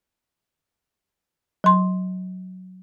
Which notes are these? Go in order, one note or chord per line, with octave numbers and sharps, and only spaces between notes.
F#3 C6